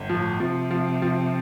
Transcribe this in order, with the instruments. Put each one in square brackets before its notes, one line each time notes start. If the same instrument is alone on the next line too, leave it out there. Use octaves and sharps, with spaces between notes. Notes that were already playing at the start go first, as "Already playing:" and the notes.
Already playing: [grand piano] G1
[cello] A2 [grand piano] F3
[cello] C3 [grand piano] F3
[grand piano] F3
F3